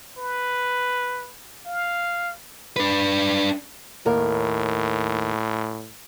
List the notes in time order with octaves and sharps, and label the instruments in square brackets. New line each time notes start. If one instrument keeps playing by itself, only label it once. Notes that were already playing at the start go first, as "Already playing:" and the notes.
[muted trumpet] B4
F5
[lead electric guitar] D4 B4
[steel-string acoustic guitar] D#2 A#4 [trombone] A2